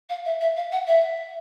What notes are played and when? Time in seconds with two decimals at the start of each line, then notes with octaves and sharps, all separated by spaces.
0.09 F5
0.25 E5
0.40 E5
0.56 F5
0.72 F#5
0.87 E5